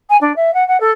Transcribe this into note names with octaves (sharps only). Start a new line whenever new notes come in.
G#5
D4
E5
F#5
F#5
A4